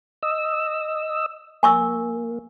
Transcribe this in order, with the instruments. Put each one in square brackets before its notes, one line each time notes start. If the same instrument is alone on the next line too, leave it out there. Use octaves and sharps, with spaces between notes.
[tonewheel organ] D#5 E6
[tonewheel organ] A#3 [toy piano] G#5 C#6 E6